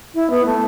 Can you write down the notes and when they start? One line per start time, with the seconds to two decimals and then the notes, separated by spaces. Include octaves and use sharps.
0.15 E4
0.30 B3
0.46 A3